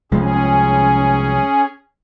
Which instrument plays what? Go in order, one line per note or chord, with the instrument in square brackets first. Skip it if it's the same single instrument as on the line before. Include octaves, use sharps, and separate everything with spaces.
[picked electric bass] C2 F3 G#3 [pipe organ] C#4 G#4